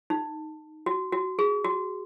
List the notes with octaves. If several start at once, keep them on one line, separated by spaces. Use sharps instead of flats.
D#4
F#4
F#4
G#4
F#4